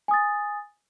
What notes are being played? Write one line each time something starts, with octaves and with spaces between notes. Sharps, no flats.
G#5 D#6 A6